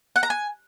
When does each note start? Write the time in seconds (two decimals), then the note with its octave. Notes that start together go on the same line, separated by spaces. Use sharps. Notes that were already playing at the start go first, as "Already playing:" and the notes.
0.16 F#5
0.23 A#5
0.30 G#5